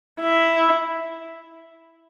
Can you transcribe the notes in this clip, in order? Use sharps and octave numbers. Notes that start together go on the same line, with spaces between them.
E4